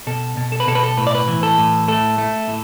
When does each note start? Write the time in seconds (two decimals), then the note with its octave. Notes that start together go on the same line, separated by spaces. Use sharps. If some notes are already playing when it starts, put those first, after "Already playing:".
0.07 B2 A4
0.37 B2
0.52 A4
0.60 B4
0.67 B2 A4
0.75 B4
0.83 A4
0.97 A2 B4
1.07 D5
1.15 B4
1.28 E3
1.43 A4
1.58 A2
1.88 A3 A4
2.18 A3
2.48 A2